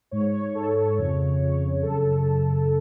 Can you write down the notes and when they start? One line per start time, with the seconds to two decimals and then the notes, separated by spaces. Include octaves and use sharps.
0.11 G#2 C#5
0.34 C#5
0.55 G#2 A4
0.98 F2 C#3 C#5
1.40 F2 C#3 C#5
1.82 F#2 C#3 A4
2.26 F#2 C#3